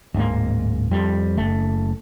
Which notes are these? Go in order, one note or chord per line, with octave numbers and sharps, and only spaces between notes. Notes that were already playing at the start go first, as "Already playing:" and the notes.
D1 G#2 A#3
F2 G3
F#1 A3